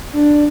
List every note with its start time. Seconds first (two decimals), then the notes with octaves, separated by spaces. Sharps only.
0.13 D4